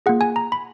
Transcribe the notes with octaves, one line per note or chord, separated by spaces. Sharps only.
A#3 F4 G#4 F#5
G#5
A#5
B5